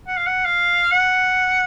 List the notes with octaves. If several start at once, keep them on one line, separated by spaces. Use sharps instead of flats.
F#5
F5
F#5
F5
F#5